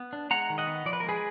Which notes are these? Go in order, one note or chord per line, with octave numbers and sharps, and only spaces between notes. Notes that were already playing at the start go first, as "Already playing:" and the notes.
Already playing: B3
D4
G#3 F#5 A#5
D#3
D#5 F#5
B3
F3 D5
B4
A#4
G#3
G#4 B4